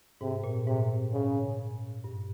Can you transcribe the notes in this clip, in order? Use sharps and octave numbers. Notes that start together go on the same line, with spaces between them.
G#2 C3
A#2
G#2 C3
G#2 C#3
G2